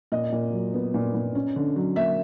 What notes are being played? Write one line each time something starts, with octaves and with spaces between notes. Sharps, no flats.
A#2 D#5
A#2
F#3
B3
A#2
A#2
C#4
D3
F#3
A#3 E5